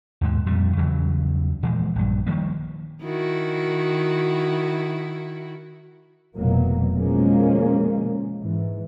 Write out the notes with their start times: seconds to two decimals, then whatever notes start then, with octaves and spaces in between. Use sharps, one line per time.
0.21 D#2 G#2 B2
0.46 F2 A#2 G3
0.77 E2 C#3 E3 F#3
1.63 A#2 E3 F3 G#3
1.96 A#1 G2
2.27 D#3 F3 G3 A#3
3.02 D#3 E4 F#4
6.36 F1 B2 E3 F#3 A#3
6.97 B2 D3 F3 G#3 A#3 C#4
8.41 G#2 E3